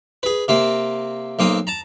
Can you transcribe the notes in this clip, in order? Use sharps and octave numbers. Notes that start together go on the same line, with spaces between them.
G#4 B4
C3 A#3 C4
B1 A#3 C4 D#6
A5 A#5